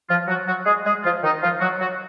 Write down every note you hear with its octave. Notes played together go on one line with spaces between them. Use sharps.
F3 F4
F#3 F#4
F#3 F#4
G#3 G#4
G#3 G#4
F3 F4
D#3 D#4
F3 F4
F#3 F#4
F#3 F#4